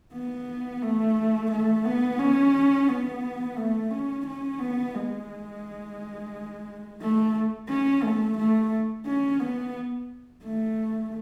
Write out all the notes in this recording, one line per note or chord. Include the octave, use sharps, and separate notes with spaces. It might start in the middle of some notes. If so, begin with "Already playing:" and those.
B3
A3
A3
B3
C#4
B3
A3
C#4
C#4
B3
G#3
A3
C#4
A3
A3
C#4
B3
A3